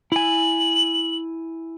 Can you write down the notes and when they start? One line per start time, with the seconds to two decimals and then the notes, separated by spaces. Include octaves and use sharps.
0.12 E4 G#5 F#7